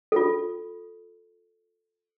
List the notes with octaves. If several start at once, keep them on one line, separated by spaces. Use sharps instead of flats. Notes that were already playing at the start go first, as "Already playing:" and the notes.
F4 A4